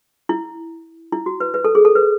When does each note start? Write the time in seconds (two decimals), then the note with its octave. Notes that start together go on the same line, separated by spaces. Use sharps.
0.29 E4
1.12 E4
1.26 F#4
1.40 B4
1.54 B4
1.64 A4
1.75 G#4
1.85 A4
1.95 B4